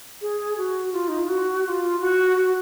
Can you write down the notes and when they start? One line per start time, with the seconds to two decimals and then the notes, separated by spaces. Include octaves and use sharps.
0.21 G#4
0.58 F#4
0.93 F4
1.08 D#4
1.19 F4
1.29 F#4
1.64 F#4
1.68 F4
2.00 F#4
2.36 F#4